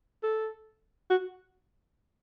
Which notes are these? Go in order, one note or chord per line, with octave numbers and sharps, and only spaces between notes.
A4
F#4